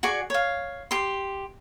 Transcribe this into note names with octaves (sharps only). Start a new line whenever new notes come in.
F#4 G#4 D5 C#6
C#5 F5
G4 C6